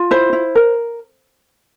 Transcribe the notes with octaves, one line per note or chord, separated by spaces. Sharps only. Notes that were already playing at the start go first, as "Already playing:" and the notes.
Already playing: F4
E4 C5
E4
A#4